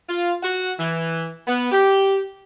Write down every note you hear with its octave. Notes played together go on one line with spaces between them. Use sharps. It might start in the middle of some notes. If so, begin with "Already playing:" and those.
F4
F#4
E3
B3
G4